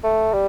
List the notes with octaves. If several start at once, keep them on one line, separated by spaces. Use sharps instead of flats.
A3
G3